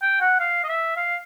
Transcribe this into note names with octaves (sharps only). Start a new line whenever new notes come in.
G5
F#5
F5
D#5
E5
F5